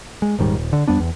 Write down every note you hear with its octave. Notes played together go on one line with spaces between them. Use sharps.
G#3
D#1 G#2 D#3 G3
D#1
D3
F2 G3 B3 D4
E2